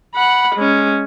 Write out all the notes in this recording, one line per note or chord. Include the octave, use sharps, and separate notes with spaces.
F#5 B5
G#3 C#4